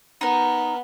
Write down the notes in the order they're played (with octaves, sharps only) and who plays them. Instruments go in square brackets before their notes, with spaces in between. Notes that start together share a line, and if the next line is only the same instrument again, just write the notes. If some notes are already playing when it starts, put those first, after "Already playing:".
[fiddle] B3 [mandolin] D#4 A#4